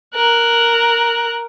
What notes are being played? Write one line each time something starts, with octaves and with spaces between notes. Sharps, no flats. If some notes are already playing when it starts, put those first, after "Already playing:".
A#4 F#6